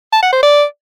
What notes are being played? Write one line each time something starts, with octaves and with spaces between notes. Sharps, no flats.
A5
F#5
C5
D5